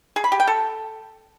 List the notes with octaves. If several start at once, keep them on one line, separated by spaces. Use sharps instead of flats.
G#4
B5
G4
G5
A4